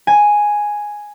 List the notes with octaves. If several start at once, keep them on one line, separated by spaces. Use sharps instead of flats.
G#5